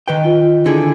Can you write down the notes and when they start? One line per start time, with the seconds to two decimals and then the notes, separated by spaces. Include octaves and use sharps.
0.08 D#3 B4 G5
0.25 F4
0.66 D3 D#3 E4 G#4